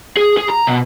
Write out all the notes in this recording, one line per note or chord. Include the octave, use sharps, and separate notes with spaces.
G#4
G#4
A#5
B2